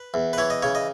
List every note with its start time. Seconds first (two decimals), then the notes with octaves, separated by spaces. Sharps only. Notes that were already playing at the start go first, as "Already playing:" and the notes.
Already playing: B4
0.14 E2
0.33 B4
0.38 E3 C#5
0.50 D#5
0.63 C#3 C#5
0.75 D#5